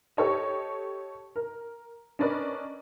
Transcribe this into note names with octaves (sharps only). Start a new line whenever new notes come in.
G4 A4 C#5 D#5
A#4
C#4 D4 A#4 B4 D5 D#5